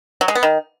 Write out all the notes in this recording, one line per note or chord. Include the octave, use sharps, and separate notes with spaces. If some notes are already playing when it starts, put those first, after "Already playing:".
F#3
G#3
B3
D#3